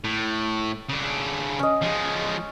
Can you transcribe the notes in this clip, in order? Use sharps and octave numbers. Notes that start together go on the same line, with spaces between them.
A2
C#3 D4
C#4 D#5
F3 G#3